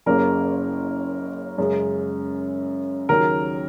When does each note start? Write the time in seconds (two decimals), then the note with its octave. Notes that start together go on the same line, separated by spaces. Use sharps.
0.06 F#1 F#2 C#3 A#3 A#4 A#5
1.58 F#2 C#3 G#3
3.09 D#2 C#3 F#3 A#4 A#5